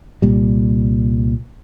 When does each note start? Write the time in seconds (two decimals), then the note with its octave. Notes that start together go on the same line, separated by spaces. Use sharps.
0.22 C2 A#2 G3